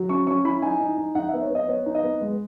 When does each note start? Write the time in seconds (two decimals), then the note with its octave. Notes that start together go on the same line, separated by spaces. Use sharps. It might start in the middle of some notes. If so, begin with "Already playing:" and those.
Already playing: F#3
0.09 C#4 C#6
0.26 C#4 C#6
0.44 E4 B5
0.62 D#4 G#5
0.80 D#4
0.97 D#4
1.15 D#4 F#5
1.29 E5
1.34 B3
1.42 C#5
1.51 B3 D#5
1.68 B3 C#5
1.86 D#4
1.95 D#5
2.03 B3
2.21 G#3